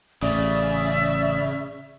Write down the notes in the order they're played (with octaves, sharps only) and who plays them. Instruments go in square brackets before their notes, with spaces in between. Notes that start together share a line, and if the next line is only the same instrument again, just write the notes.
[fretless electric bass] A1 [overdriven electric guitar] C#3 [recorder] D5 [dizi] E5